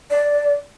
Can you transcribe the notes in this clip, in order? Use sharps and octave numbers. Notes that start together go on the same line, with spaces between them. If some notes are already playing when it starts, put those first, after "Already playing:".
D5